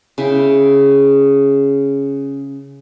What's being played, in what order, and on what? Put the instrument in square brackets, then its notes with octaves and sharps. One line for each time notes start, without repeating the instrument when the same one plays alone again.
[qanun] C#3 E4 E5 G5